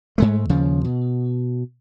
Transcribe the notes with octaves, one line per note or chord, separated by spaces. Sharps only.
G#2 G#3 A3
D#2 C#3 F3
B2